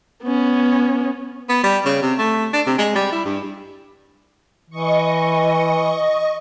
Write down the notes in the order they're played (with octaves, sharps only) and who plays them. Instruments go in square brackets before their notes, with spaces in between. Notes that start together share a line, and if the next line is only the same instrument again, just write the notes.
[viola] B3 C#4
[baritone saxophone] B3
G3
C#3
C3
A3
D4
C3
G#3
G3
E4
G2
[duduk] E3 [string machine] D#5 C#6